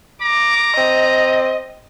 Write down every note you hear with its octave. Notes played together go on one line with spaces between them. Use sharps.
A#5 D6
C4 D#5